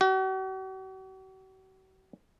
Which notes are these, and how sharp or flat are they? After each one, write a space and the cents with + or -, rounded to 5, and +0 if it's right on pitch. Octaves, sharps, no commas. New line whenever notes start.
F#4 +45